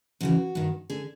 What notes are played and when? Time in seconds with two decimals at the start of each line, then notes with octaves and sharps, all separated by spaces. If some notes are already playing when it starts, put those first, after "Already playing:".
0.21 F2 C#3 E3 F#4
0.55 G2 D#3
0.90 D3 G#4